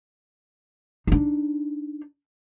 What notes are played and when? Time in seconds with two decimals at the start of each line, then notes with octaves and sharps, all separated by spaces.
1.07 D4 D#4